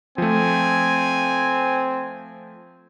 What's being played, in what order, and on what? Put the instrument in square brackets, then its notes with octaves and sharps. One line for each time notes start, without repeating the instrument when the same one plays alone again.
[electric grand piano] F3 A3 [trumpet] C4 [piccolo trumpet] G#5